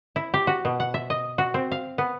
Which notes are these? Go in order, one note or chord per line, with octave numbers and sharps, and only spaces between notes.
E4
G4
F#4
B2
F#5
E5
D#5
F#4
C4
F5
B3